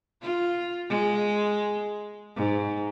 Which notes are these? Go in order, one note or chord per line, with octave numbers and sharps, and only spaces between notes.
F4
G#3
G#2